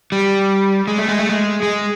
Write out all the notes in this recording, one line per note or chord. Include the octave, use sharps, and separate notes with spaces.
G3
G#3
A3
G#3
A3
G#3
G#3